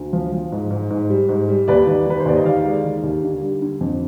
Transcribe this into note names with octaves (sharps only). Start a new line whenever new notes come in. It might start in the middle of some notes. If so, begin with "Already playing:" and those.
Already playing: D2
F3
F3
G#2
G#2
G#2
G3
G#2
G3
D#2 B4 D5
D#3
D#3 B4
C5
D#2 D5
D#5
D#3 D5 F5
G#3
D#3
D#2
D3
G3
D3
F2